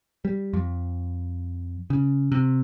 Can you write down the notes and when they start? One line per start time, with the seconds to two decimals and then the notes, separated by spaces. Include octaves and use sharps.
0.25 G3
0.53 F2
1.90 C#3
2.32 C3